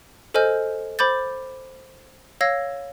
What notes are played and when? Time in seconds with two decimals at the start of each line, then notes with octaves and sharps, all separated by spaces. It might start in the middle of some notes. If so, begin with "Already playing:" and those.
0.34 A4 C5 D#5 G#5 F6 G6
0.99 C5 B5 D6 G6 A6
2.41 C#5 F5 E6 G#6 A#6